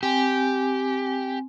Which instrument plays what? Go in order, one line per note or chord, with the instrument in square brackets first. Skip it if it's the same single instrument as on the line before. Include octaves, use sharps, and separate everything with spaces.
[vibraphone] C4 G#5 [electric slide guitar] G4